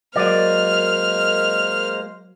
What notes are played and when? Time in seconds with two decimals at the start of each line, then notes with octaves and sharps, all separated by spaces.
0.16 F#3 G#3 A#3 A#4 C5 D5 D#5 F6